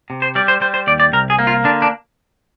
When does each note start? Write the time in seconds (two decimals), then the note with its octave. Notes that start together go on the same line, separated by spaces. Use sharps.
0.10 C3
0.22 C5
0.35 G3 D5
0.48 C5
0.61 G3 C5
0.74 C5
0.87 D#2 D5
1.00 D5
1.13 C2 A#4
1.30 G#4
1.39 A#3
1.47 F4
1.64 D3 D4
1.82 D4